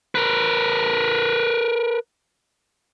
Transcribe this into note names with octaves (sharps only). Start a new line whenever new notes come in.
A#4 B4